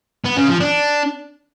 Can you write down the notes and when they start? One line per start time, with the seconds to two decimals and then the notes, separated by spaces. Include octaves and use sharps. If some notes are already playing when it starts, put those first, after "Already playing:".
0.25 B3
0.36 C#3
0.48 F3
0.60 D4